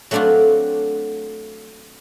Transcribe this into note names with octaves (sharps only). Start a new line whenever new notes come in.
F#3 A3 C4 D4 F4 F#4